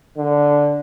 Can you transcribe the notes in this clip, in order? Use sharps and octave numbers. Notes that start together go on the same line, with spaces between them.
D3